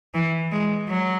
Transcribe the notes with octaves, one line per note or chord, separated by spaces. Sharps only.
E3
G#3
F#3